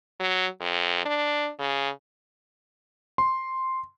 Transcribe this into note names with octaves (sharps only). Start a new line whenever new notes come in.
F#3
F2
D4
C#3
C6